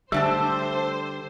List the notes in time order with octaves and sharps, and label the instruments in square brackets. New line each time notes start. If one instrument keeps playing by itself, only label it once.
[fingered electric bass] D3 G3 [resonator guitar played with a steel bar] A3 D4 A5 [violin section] C5 [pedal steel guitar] E6